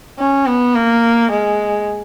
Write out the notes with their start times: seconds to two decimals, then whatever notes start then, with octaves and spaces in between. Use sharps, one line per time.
0.19 C#4
0.46 B3
0.74 A#3
1.31 G#3